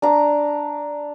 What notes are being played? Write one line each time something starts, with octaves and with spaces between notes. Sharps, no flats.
D4 A#5